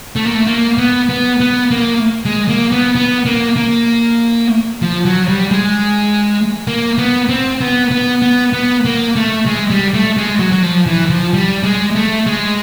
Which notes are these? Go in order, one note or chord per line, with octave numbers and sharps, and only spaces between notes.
A3
A#3
A3
A#3
B3
B3
B3
A#3
G#3
A#3
B3
B3
A#3
A#3
F3
F#3
G3
G#3
A#3
B3
C4
B3
B3
B3
B3
A#3
A3
G#3
G3
A3
G#3
F#3
F#3
F3
E3
F3
G3
G#3
A3
G#3